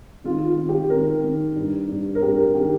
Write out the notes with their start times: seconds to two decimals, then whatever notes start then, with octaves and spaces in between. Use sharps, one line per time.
0.24 D#3 F4
0.47 F4
0.58 D#3
0.69 G4
0.90 D#3 A#4
1.23 D#3
1.56 G2
1.88 G2
2.15 A#4
2.21 G2 G4
2.37 A#4
2.54 D#3 G4